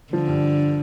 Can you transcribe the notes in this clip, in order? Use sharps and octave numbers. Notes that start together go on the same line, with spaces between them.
D3 F3
G2